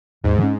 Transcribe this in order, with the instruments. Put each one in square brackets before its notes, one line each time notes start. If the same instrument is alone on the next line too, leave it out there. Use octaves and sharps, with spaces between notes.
[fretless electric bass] D#2 [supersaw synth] G#2
[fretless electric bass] D#3
C#4